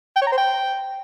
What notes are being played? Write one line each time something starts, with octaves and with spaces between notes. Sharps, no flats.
G5
C#5
A#5
C5
G5